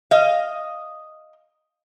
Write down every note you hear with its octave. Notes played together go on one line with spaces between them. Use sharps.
D#5 F5